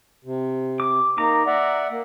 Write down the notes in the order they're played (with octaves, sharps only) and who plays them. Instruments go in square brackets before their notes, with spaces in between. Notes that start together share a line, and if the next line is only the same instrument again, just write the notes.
[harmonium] C3
[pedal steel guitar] D6
[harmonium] A#3 D#4 [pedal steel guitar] A#5 D6
[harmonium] D5 E5 F#5
A#3